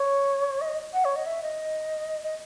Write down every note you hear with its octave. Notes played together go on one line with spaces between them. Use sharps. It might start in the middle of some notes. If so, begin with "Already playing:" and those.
Already playing: C#5
D#5
F#5
C#5
D#5
E5
D#5
D#5